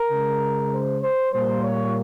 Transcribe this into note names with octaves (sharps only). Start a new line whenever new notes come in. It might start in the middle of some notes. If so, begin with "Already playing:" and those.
Already playing: A#4
C#3 G#3
C5
C5
A#2 G3 A#3 C5
C#5